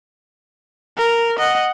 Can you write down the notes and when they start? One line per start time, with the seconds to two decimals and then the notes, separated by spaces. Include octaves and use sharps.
0.97 A#4
1.39 D#5 F#5